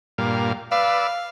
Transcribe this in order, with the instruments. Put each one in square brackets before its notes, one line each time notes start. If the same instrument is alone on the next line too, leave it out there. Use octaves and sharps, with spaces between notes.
[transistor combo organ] G2 A#2 F5
[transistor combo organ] B4 D5 E6 [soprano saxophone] F5